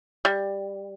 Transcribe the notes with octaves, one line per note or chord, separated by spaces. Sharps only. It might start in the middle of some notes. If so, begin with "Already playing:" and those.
G3